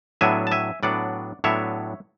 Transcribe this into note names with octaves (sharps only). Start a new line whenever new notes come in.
A2 F#3 B3 D4 E5 G#5
A5
E5 G#5
A2 F#3 B3 D4 D5 F#5
A2 F#3 B3 D4 C#5 E5